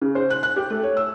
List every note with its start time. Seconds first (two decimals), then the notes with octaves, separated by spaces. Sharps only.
0.02 C#3
0.15 C5
0.30 F#6
0.43 F#6
0.56 G4
0.70 A3
0.83 C#5
0.97 E6